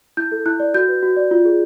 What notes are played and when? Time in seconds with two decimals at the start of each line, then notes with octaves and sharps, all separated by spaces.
0.17 E4 G6
0.32 A4
0.46 E4 F#6
0.60 D5
0.74 F#4 G6
0.89 B4
1.03 F#4
1.17 D5
1.31 F4
1.45 G#4